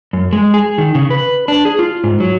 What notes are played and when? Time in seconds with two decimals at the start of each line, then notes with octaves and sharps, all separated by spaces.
0.13 F#2
0.33 G#3
0.54 G#4
0.78 D#3
0.95 C#3
1.10 B4
1.48 D4
1.65 G#4
1.79 F4
2.04 G#2
2.20 F#3